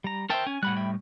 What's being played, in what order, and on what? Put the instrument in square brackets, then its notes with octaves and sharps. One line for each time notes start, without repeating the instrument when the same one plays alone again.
[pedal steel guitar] G3 A#5
[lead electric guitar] A#4 G5 [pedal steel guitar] C5 E5 A5
[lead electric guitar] C#4 [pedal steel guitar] G#5
[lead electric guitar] A2 G3 [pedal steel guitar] F#5 B5 F#6
[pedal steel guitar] E5 G5 B5